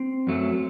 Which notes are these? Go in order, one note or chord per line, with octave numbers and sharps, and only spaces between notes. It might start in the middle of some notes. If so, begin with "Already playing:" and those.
Already playing: C4
F#2 F#3 A3